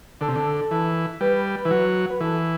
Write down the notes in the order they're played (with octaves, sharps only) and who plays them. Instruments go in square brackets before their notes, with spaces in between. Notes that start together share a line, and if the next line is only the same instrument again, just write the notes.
[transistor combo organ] D3 [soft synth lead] A4
[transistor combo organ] C3
D3
E3
[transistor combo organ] G3 [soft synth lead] B4
[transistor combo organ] E3
F#3
[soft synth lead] B4
[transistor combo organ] E3 [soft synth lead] A4